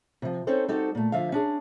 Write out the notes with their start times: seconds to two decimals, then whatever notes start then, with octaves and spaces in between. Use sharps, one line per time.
0.22 C3 F3
0.47 C4 C#4 D#4 A4 C5
0.68 G3 C4 D#4 F#4 A4 C5
0.95 A#2 A3
1.12 D3 F3 E5 F5
1.32 C#4 D4 G#4